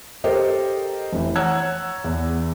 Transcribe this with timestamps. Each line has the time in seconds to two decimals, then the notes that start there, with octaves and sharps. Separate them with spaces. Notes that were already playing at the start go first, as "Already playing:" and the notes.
0.24 G4 A4 A#4 C5 D#5
1.13 F1 E3
1.36 C#5 F#5 A#5 E6 F#6 G#6
2.04 E2